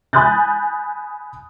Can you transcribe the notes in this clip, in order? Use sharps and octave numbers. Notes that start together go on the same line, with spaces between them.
G#5 B5 D#6 F#6 G6 A6